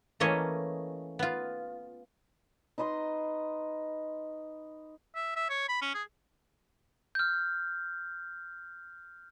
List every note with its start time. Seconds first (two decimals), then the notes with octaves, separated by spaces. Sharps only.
0.20 E3 A3 A#3 C#4 C#5 D#5
1.19 B3 F4
2.78 D#4 B4 D#5 C6
5.15 E5
5.36 E5
5.50 C#5
5.69 B5
5.82 C#4
5.95 G#4
7.15 F6 G6